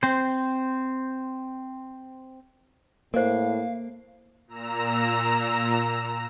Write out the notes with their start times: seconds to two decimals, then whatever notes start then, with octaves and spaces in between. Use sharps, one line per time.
0.03 C4 C5
3.14 A2 A#3 A#4 C5 F5
4.47 A#2 A#5 E6